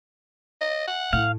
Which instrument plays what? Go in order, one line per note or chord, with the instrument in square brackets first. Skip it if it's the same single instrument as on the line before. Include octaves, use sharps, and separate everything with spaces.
[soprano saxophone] D#5
F#5
[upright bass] A2 [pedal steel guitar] F5